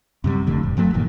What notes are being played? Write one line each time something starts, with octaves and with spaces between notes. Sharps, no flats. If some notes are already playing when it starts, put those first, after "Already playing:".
F#2 C3 G3
F1 F2 A2 D3
E1
G2 F3 F#3 A3
G1 A#2 D#3